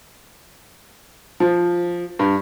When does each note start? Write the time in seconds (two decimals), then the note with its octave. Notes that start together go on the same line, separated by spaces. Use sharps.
1.40 F3
2.19 G2